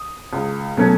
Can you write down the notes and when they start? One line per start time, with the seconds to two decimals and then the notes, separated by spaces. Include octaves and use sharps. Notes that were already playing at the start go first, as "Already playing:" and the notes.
Already playing: D#6
0.33 C#2
0.77 B2 F#3 A3 C#4